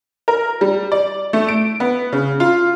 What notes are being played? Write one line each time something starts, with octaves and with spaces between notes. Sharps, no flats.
A#4
G3
D5
A3
D7
B3
C#3
F4